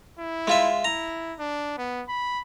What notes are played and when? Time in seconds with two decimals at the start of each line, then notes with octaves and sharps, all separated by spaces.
0.18 E4
0.47 G#3 F4 E5
0.84 E4 A#5
1.39 D4
1.78 B3
2.09 B5